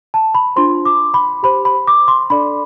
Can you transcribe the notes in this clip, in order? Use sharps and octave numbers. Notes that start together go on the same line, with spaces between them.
A5
B5
D4 F4 C5 C6
D6
B5
G4 C5 B5
B5
D6
C6
D4 A4 D5 B5